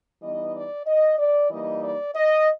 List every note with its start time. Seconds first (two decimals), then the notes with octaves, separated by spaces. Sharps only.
0.21 E3 G3 B3 D#4 D#5
0.54 D5
0.86 D#5
1.18 D5
1.50 E3 G3 A#3 D#4 D#5
1.82 D5
2.15 D#5